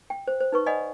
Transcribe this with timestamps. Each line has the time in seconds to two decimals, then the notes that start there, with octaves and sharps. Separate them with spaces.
0.10 G5
0.28 C5
0.40 C5
0.52 D#4 B4 C#6
0.66 D5 D#5 F#5 G#5 B5 D#6